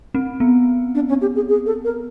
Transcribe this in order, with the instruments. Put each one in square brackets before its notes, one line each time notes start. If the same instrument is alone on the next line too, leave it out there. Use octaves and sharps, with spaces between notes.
[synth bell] C4
B3
[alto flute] D4
C#4
G4
G#4
G#4
A4
A#4